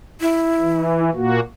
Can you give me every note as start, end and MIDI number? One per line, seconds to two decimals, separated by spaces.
0.21 1.01 64
0.59 1.10 52
1.14 1.40 46
1.14 1.40 58
1.14 1.40 66